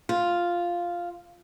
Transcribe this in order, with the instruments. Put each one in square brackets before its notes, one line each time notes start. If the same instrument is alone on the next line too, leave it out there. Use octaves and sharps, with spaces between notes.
[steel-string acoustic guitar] F4